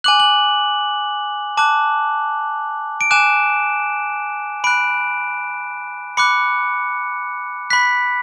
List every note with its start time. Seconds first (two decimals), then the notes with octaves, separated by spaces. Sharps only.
0.04 G#5 D6 F#6 F#7
0.20 F#7
1.57 A5 D6 F#6
3.01 D7
3.11 G#5 D6 F#6 E7
4.64 B5 F#6 D7
6.17 B5 D6 F#6 C#7
7.70 B5 F#6 B6